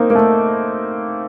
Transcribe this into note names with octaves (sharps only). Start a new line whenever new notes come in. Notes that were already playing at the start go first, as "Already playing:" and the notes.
Already playing: A#3 C4 D#4
A#3
A3